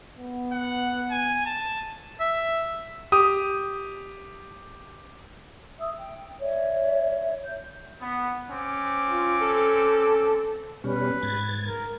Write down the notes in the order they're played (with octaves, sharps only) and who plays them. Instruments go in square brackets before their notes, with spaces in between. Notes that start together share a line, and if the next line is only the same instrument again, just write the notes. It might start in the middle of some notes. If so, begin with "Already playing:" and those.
[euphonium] B3
[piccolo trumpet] F#5
G#5
A5
[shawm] E5
[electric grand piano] G4 D#6
[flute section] E5 D#6 E6
G5
C#5 D5 E5
G6
[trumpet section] B3
C4 C#4 D6
[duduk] F4
A4
[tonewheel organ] B2 G3 C#4 [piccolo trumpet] B4
[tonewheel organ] G#2 G#6 A6
[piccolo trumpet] A#4